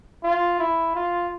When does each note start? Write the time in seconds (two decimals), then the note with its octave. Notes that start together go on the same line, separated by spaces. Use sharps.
0.24 F4
0.60 E4
0.95 F4